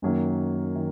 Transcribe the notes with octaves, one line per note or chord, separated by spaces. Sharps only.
F#2 D#3 F#3 A#3 C#4
D#3